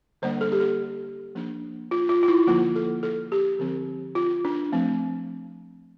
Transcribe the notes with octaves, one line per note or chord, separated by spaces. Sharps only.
D3 G3 A#3 D4 C5
A4
G4
A4
F3 A#3 D4
F4
F4
F4
E4
D3 F3 A#3 F4
A4
A4
G4
D3 F3 C4
F4
D4
F3 A3 C4